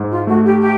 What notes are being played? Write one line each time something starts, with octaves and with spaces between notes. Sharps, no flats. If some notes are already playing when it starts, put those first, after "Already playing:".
Already playing: G#2
F4
A3 F#4
G4
G4